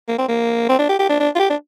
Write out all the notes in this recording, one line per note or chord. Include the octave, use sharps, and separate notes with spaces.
A#3
C4
A#3
C4
D4
G4
G4
D4
D4
F4
G4
D4